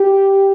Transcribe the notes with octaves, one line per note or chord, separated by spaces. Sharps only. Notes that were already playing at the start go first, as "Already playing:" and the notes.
Already playing: G4